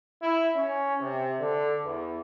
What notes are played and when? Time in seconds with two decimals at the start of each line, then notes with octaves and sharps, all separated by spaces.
0.22 E4
0.57 C#4
1.01 C3
1.40 D3
1.85 E2